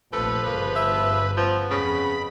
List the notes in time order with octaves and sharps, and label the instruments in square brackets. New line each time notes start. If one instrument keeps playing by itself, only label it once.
[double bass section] F1 A#1 [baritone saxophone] F3 [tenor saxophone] A4 [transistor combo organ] B4
[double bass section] G1 C#3 [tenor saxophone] A#3
[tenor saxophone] E5
[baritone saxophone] F3 [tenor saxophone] B3
[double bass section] F2 [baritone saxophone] C#3 [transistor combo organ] B5